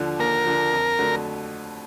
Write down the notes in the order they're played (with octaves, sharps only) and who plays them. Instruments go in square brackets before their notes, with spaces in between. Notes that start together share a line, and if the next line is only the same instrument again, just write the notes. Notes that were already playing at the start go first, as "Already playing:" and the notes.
Already playing: [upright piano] D#2 D3 F3
[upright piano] D#2 [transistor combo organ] A#4
[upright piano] D3 F3
F2
D3 F#3 A3